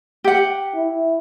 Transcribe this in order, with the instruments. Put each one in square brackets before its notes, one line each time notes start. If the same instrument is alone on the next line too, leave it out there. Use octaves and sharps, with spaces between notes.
[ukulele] G4 F#5
[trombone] E4